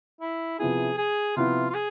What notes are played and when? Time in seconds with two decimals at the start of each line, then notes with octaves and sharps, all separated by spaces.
0.21 E4
0.59 C3 F3 B3 E4 G#4
0.97 G#4
1.36 C3 F3 B3 E4 F4
1.70 F4
1.74 G#4